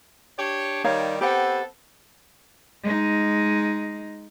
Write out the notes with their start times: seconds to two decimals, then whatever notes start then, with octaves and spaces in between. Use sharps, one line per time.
0.38 D4 G4 C#5
0.84 D#3 G3 D#4 C#5 F5
1.21 B3 C4 G4 A4 F#5
2.83 G#3 D#4